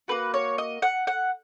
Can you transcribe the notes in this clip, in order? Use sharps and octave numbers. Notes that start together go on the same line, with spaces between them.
A#3 D#4 F#4 B4
C#5
D#5
F#5
F#5